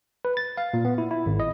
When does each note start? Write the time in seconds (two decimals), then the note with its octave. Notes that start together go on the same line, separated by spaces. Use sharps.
0.25 B4
0.37 A6
0.57 F5
0.74 A#2
0.85 B3
0.98 E4
1.11 E4
1.26 G#1
1.40 D#5